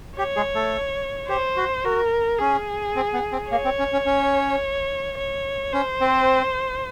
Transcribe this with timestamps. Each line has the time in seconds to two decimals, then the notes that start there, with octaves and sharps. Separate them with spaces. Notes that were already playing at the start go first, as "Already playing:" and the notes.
0.17 G4 C#5
0.36 G#3 G#4
0.55 A3 A4
1.28 G4 C5
1.56 F#4
1.84 F#4 A#4
2.39 C#4 G#4
2.96 C4
3.13 B3
3.32 C4
3.51 A#3 C#5
3.65 C4
3.79 C#4
3.93 C#4
4.06 C#4
5.18 C#5
5.73 C#4 C5
6.01 C4